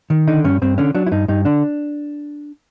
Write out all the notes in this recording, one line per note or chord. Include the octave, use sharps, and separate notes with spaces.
D#3
D3 D#4
G2 C#4
G2 C4
D3 C#4
F#3 D4
E4
G2 D#4
G2 D#4
D3 D4